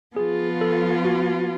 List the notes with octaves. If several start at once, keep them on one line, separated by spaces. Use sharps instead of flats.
F3 B3 F4 G#4
A4
F#4